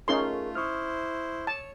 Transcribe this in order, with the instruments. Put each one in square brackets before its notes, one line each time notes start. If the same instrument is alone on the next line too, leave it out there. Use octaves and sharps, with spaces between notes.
[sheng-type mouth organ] A3 F4 [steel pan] C#4 D#4 C6 [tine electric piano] G#4 A#4
[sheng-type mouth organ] E4 C5 [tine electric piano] C#6 D#6 F6
[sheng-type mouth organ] C#5 [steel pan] A5